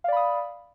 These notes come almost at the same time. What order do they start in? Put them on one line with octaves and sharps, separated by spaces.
F5 D5 B5 D#6